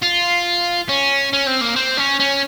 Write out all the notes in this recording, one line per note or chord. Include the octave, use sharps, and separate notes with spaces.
F4
C#4
C#4
C4
A#3
C4
C#4
C#4